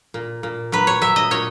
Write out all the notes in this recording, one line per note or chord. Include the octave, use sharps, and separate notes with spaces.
A#2
A#2
F#3 B4
C#5
F#3 E5
D#5
A#2 C#5